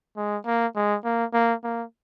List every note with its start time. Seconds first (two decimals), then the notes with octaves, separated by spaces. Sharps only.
0.17 G#3
0.46 A#3
0.76 G#3
1.04 A#3
1.33 A#3
1.64 A#3